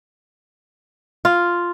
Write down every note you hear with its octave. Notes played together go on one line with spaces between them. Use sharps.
F4